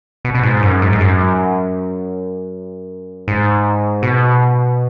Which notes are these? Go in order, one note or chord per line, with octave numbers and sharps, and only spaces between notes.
B2
B2
G#2
F#2
G#2
G#2
F#2
G#2
B2